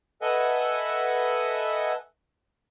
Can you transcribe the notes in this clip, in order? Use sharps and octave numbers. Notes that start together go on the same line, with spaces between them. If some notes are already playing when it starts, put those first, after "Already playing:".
A4 B4 D#5 E5 F#5 G#5